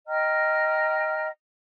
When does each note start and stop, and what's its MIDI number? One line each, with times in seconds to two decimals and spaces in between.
0.07 1.28 75
0.07 1.28 79
0.07 1.28 82
0.07 1.28 89